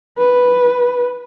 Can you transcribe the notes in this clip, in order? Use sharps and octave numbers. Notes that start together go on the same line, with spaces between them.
B4